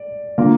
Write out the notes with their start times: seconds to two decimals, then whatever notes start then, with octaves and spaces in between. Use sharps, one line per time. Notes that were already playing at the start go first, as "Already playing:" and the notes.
Already playing: D5
0.38 D3 A#3 F4